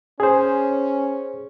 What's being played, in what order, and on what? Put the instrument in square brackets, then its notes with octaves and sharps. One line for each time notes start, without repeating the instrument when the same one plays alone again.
[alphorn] C#4 [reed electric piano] G#4 C5